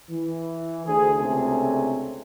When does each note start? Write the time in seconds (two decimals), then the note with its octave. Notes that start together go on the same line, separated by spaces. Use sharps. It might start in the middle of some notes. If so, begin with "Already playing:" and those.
0.10 E3
0.86 D2 G#4
1.19 C#2 C3 A3 D4 G#5